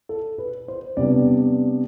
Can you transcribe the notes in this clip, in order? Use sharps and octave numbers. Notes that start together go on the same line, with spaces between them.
A4
B4
C5
C3 G3 B3 D4 D5